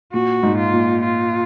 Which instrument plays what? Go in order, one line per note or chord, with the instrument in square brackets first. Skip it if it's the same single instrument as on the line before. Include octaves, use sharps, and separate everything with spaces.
[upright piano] A#2 [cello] F#4
[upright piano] G#2
[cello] F4
[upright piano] A#2
[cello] F4